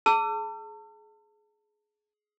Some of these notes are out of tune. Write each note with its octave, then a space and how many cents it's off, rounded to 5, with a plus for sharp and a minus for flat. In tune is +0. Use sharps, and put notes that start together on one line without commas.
G#4 +20 A5 +40 E6 +40